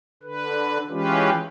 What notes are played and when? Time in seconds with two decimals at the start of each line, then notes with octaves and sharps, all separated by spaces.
0.23 D3 B4
0.89 E3 G#3 C#4 F4 G4 B4